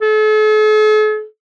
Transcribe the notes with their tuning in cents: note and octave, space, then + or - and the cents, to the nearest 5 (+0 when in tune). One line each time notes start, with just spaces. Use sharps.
A4 -45